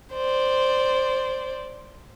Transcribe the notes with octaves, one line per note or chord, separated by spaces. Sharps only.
C5 D5